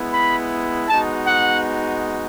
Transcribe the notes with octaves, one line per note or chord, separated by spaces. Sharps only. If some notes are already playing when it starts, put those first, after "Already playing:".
Already playing: G#3 B3 E4
B5
G#3 B3 D#4 F#4 A5
F#5